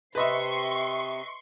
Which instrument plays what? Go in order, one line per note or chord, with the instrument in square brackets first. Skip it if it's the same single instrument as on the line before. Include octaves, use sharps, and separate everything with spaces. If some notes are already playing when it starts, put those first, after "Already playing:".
[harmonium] C3 [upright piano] B4 D#5 E5 [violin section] C6 C#6 C7